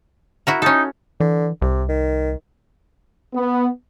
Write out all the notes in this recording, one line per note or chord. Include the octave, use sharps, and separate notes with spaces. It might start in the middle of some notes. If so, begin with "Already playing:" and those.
E4 F#4 A#4
C#4 D#4 A4
D3 E3
C2 C3
D#3
B3